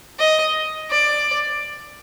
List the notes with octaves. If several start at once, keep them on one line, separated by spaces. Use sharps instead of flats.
D#5
D5